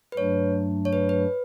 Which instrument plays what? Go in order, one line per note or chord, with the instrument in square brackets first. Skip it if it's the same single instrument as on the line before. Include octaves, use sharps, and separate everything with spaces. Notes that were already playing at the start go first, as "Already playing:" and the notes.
[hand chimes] B4
[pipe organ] G2 F#3 A3 D4 [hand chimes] C#5
[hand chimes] C#5
B4
B4